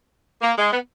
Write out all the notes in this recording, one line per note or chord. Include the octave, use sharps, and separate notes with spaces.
A#3
G#3
B3